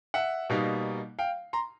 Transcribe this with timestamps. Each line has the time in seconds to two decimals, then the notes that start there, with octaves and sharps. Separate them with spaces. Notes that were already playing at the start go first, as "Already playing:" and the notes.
0.14 E5 F#5
0.50 B2 G3 A#3 D#4
1.19 F5 G5
1.53 A#5 C6